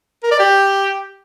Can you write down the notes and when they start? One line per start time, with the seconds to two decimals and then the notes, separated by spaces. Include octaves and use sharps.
0.23 A#4
0.31 D5
0.39 G4